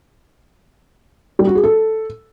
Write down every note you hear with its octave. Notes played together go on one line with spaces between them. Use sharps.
G3
F#4
G#4
A4